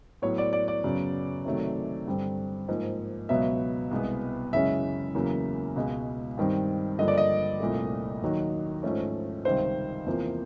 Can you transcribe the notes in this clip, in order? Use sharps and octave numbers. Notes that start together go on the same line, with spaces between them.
A2 F#3 B3 C#5
D5
D5
D5
F#2 C#3 F#3 B3
C3 D#3 F#3 A3
G2 D3 G3 C4
G#2 F3 A#3
C#2 B2 F#3 B3 E5
C2 B2 G#3 B3
F#2 C#3 E3 G#3 C#4 E5
E2 C#3 F#3 A#3
C#2 B2 G#3
G2 D#3 G3 C4
G2 D3 F3 A#3 D#5
D5
D#5
C2 A#2 F3 A3
D#2 D#3 F#3
G#2 F3 A3 C#4
C#2 C3 D#3 G3 C4 C5
E2 C3 F3 A#3